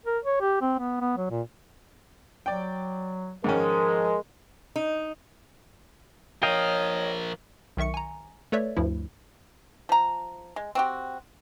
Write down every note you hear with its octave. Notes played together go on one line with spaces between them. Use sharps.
A#4
C#5
G4
C4
B3
B3
F#3
A#2
F#3 D5 G5
G#2 D#3 F3 G#3 C#4 A#4
D#4
F3 A#4 C#5 D#5 F5 G5
B1 D#3 E5 C#6 C#7
G#5 A#5
A3 A4 B4 C#5 D5 E5
D2 G2 F3 E4
F3 A#5
G#3
C4 F#4 G4